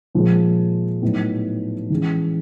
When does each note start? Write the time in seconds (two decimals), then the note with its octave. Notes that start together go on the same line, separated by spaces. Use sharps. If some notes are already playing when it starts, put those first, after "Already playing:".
0.15 A#2 F3 G#3
1.02 A2 F#3 B3 D#4
1.90 E3 G#3 C#4